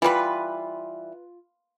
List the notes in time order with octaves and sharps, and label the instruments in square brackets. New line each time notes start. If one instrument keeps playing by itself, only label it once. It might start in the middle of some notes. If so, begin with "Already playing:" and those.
[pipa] E3 G3 [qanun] F4 B4